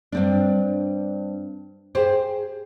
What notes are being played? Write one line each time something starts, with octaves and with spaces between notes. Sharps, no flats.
G2 C4 D4
G4 G#4 C5